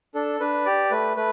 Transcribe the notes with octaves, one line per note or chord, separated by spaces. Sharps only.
D4 A4
D4 B4
G4 D5
A3 B4
A3 B4